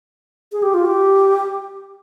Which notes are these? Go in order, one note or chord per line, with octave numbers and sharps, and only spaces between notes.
G#4
G4
F4
G4